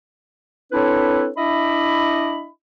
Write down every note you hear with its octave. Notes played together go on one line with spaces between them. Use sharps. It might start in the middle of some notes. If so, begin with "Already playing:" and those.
C4 D4 E4 A4 B4 C#5
D4 E4 D#5 E5 B5